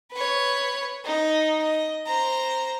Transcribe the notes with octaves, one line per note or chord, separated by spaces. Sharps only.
B4 C#5
D#4
D#5
C5 A#5